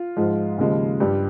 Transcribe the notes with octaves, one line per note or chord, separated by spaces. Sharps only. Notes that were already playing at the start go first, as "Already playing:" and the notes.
Already playing: F4
G#2 F3 G#3
D#2 C#3 F3 G#3
G2 G3